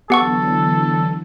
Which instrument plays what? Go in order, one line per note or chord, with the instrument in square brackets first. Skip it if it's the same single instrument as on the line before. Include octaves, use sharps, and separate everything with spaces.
[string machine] D3 E3 F#3 [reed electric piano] B3 [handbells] G4 F#5 C#6 [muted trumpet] A4